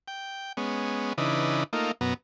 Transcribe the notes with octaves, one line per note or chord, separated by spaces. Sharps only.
G5
G#3 B3 C#4
C#3 E3 D4 D#4 B4
A3 A#3 D#4 F4
F#2 B2 B3 A#5